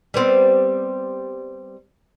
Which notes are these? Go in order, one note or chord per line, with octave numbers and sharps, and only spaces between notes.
G3 B3 C4